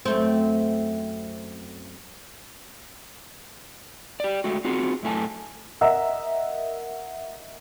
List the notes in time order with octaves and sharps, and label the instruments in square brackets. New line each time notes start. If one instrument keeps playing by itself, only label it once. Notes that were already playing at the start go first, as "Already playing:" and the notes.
[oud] F#2 A3 C4
[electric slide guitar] G4 D5
G#3 A3 F#4
C4 F4 F#4 G#4
F#2 A2 A3 G#5 A5
[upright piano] A#4 D#5 E5 F#5 A#5 E6